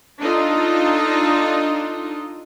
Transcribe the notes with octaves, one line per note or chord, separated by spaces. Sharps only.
D4 D#4 F4 A4 D#5